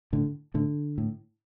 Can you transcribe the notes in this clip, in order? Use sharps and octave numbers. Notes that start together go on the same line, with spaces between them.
A2 D3
A2 D3
A2